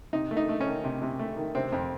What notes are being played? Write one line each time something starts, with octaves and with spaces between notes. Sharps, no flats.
C3 D#4
A3
D#4
A3
C#4
D#3
C3
C3
A3
D#3
C3 C4
F2